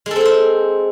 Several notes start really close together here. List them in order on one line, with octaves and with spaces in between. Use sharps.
G#3 A4 C4 G#4 C5